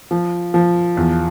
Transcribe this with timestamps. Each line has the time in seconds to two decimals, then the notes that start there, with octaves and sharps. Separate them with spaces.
0.11 F3
0.54 F3
0.97 E2